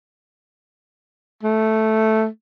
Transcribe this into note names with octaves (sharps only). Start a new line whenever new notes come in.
A3